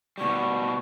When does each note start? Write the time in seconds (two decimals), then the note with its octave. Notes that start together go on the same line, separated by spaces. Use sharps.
0.18 B2 G3 C#6